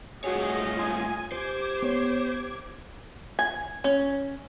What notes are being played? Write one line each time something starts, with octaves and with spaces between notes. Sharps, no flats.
G2 A3 F4 F#4 G#4 C#5 D#5
G#5 C6
G4 C5 D6 G#6
B3 C#5
G#5
C#4